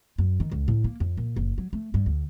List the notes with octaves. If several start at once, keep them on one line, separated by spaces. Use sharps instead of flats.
F#2
D#3
C#2
A2
A#3
F2
A#2
F#1
F#3
A3
G2
D2